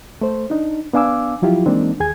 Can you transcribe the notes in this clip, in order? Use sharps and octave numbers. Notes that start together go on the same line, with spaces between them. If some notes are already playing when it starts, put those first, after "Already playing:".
A3 C5
D4 D#4
B3 D4 F5 G#5 D6 E6
F3 F#3 E4 F4 G4
E3 G#3 A#3 C4 D4 D#4
D#2 G#4 G#5 G#6